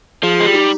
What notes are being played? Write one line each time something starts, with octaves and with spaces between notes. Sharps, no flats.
F3 F4 G#4
G#3
G3
D#4 G4